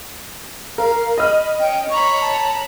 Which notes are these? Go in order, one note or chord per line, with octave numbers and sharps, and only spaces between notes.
A#4 F5
D#5 B5 F6
C#4 G5
C#5 A#5 B5 C#6
A5